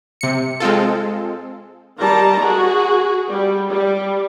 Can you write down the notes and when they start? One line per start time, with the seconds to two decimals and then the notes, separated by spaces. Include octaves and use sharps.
0.21 C3 C#7
0.60 G#3 C4 F4 A4
1.98 D#3 G3 A5 A#5
2.42 F#4 G#4
3.29 G3
3.69 G3